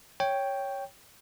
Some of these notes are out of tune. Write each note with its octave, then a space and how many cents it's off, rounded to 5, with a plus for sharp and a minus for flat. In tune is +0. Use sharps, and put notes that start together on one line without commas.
C#5 +0 G5 +0